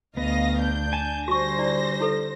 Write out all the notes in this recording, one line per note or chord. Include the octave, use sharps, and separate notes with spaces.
D2 B3 D#5 F5 A#6
D4 G6
G#5 A5
D3 G3 F#4 C5 C#6 A#6
E4 D5
E4 A4 B4